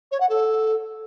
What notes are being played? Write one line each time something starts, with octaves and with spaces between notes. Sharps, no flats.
C#5
F#5
A4